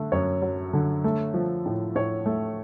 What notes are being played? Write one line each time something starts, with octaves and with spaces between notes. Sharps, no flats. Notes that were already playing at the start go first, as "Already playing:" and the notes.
Already playing: D3 A3
F#2 C#5
F#3
D3
A3
F3
A2
A2 C#5
A3